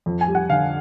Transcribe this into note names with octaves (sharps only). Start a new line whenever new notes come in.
F2
G#5
G3
F#5
D3 F5